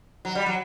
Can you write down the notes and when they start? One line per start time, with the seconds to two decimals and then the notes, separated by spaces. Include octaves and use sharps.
0.25 F#3
0.35 G3
0.46 F#3